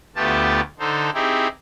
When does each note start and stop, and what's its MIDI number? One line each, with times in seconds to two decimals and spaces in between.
0.16 0.61 38
0.16 0.61 57
0.16 0.61 59
0.16 0.61 65
0.16 0.61 67
0.16 0.61 81
0.79 1.10 50
0.79 1.10 63
0.79 1.10 69
0.79 1.10 72
1.14 1.47 60
1.14 1.47 63
1.14 1.47 64
1.14 1.47 67
1.14 1.47 68